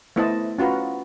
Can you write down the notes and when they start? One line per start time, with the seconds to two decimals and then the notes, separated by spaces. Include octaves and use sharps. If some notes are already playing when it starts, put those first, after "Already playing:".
0.16 A3 B3 E4 C5 D#5 A5
0.58 C#4 F4 F#4 B4 A#5